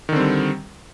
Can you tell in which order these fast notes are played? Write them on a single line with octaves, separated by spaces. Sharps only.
D#3 D3 C4 G3